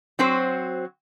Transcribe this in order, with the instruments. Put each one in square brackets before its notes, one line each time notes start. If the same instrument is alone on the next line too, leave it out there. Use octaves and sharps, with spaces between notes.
[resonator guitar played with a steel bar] F#3 C4 F#4 C5